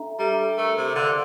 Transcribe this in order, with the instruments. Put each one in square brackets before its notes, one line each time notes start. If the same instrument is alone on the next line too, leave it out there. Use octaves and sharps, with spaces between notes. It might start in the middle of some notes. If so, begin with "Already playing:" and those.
Already playing: [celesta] D4 A4 E5 A#5
[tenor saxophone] G3 [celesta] A4 E5 A#5
[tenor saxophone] A3 [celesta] A#4
[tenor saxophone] C3
[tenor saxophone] D3 [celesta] D5 F5 C6